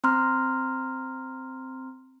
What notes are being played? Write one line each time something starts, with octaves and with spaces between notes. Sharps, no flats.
C4 A#5 C6 F6